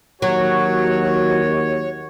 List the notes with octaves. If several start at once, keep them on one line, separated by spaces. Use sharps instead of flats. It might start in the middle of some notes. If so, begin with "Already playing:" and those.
D#2 F#3 F#4 C#5